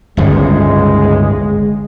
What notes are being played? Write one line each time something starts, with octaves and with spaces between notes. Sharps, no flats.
G1 C#2 A2 G#3